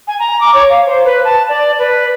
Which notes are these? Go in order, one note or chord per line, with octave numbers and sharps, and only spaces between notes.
G#5
A#5
D6
C#5
F5
C5
B4
A5
D5
B4